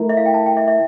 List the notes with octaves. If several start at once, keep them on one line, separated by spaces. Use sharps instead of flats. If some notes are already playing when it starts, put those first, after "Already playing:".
Already playing: A3 E4 A#4
E5
F5
G5
A5
G5
E5
E5